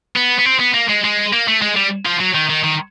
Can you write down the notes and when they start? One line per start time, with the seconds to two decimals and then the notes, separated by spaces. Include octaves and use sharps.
0.16 B3
0.39 B3
0.46 C4
0.60 B3
0.74 A#3
0.89 G#3
1.04 G#3
1.33 A#3
1.48 A3
1.62 G#3
1.76 G3
2.06 F3
2.20 F#3
2.34 D#3
2.49 D#3
2.64 D#3